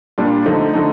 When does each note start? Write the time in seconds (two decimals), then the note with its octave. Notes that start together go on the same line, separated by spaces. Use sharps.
0.18 A#2 G3 D4 F4
0.46 D3 F3 A3 D#4
0.73 D3 F3 A3 D#4